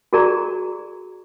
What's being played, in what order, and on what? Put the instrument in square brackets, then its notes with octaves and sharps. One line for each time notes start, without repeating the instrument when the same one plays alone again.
[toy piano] F#4 G#4 A#4 D5 A#5 C#6